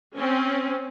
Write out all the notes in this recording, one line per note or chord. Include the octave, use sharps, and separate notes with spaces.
C4 C#4